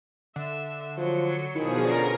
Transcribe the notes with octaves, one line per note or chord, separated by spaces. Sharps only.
D3 E5
F3 F#3 C#7
B2 D#3 F3 E4 G#4
D3 C#4 A#4 D5 A#5